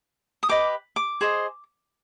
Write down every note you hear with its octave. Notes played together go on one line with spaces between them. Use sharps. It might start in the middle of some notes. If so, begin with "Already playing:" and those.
D#6
G4 B4 D#5 D6
D6
G#4 C5 D#5